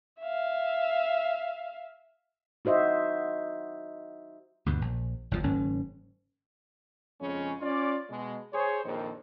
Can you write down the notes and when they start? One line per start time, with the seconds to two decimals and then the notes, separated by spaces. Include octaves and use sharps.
0.20 E5 F5
2.65 D#4 F#4 C5 D#5 E5
4.66 D2 G2 B2
4.82 A#1
5.31 F#1 E2 C#3 F3
5.43 F#1 G#2 D#3 C#4
7.20 F2 C#3 G#3 C#4
7.61 C#4 F4 D5
8.10 B2 G#3
8.53 G#4 C5 C#5
8.85 A#1 F2 A#2 D#3